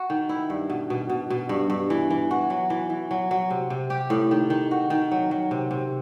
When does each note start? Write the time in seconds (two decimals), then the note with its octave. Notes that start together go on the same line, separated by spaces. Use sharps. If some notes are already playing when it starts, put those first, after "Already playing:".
Already playing: F#4
0.10 D#3
0.29 E4
0.50 G2
0.70 B2
0.90 B2
1.10 B2
1.30 B2
1.49 G2
1.70 G2
1.90 E3
2.11 E3
2.31 F#4
2.50 F#3
2.70 E3
2.90 E3
3.11 F#3
3.31 F#3
3.50 C3
3.70 C3
3.90 G4
4.10 A2
4.31 D#3
4.50 D#3
4.71 F#4
4.90 D#3
5.11 F#3
5.31 F#3
5.51 C3
5.71 C3